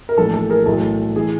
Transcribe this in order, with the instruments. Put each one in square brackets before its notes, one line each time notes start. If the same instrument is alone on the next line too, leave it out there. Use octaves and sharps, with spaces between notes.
[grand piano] A#4
A#1 A2 E3 A4
A4
G#4 A#4
B1 A2 E3 A4
E3 G#4